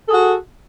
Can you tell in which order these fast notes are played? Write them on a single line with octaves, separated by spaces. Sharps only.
A4 G#4 F#4